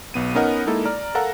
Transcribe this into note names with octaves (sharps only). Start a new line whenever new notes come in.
B1 B3 D#7
B3 C#4 D#4 A#4 D#5 F#5
G#3 A#3 D#4 E4 A4
D5 A#5 F6
A4 A#4 F5 F#5 A#5